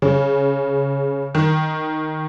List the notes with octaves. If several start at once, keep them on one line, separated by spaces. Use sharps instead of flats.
C#3
D#3